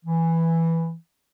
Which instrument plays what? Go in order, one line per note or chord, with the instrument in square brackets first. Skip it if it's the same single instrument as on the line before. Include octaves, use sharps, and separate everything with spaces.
[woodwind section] E3